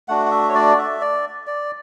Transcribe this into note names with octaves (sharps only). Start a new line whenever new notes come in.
A3 D4 F#4 F#5
F#5
E5
C#5
D5
E5
D5
D5